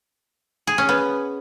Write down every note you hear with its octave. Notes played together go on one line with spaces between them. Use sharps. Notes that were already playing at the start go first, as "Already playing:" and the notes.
G#4
C#4
B3